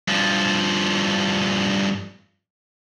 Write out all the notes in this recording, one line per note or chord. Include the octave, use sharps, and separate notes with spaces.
G2 F3